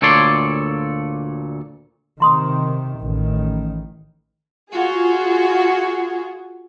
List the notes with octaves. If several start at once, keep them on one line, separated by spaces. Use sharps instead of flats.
D2 A#2 A4 C#5 D5 C6
C3 D#3 A#5 C6 D#6
A1 D#3
F4 F#4 G#4